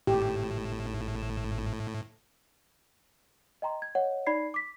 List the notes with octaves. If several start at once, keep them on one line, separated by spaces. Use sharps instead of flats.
G#1 A2 G4 E7
D#5 G5 A#5 C6
G#6
C#5 D#5 F#5
D#4 D5 B5 G#6 C7
D6 B6